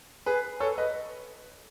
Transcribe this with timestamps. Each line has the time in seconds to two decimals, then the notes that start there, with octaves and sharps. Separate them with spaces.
0.26 G#4 B4
0.60 A4 C#5
0.78 B4 D#5